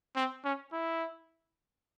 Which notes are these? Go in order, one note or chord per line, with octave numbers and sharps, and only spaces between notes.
C4
C#4
E4